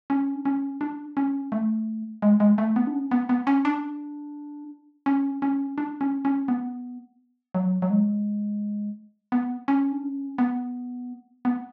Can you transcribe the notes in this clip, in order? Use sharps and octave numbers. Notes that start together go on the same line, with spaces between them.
C#4
D4
C#4
D4
C#4
A3
G#3
G#3
A3
B3
D4
C#4
B3
B3
C#4
D4
C#4
C#4
D4
C#4
C#4
B3
F#3
F#3
G#3
B3
C#4
D4
C#4
B3
B3